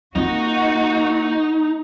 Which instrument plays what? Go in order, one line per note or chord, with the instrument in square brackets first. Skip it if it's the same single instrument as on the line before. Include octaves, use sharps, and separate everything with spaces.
[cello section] A#3 F#4 [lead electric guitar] D#4 [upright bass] F4